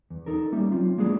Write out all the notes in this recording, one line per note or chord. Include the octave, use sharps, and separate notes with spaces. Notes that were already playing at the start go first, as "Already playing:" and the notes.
E2
D#4 A4 A#4
G3 A#3 C#4 D#4 E5
F#3 C4 F4
G#3 A#3 D4 F4 G#4